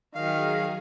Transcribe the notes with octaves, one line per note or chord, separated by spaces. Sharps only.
D#3 F#3 G#4 F5